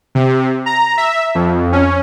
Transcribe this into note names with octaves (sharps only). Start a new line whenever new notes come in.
C3
A#5
E5
F2
C#4